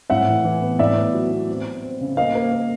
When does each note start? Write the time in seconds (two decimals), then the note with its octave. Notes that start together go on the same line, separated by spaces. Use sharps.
0.10 A2 E5 F#5
0.28 E3
0.44 E3
0.62 B3
0.79 A2 D5 E5
0.96 B3
1.14 F#3
1.31 B3
1.49 C4
1.65 C4
1.83 C4
2.01 C#3
2.17 A#3 D#5 F5
2.35 A#3
2.52 A#3